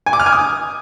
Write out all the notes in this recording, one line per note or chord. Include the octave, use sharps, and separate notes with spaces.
G#5
D6
F6
G#5
D#6